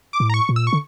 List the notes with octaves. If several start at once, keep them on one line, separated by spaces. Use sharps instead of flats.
D6
A2
A#5
C#6
A#2
E6
C#6
D3